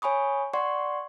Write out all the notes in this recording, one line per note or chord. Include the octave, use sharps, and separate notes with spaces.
C#5 G#5 B5 C#6 D#6
D5 F#5 C6 C#6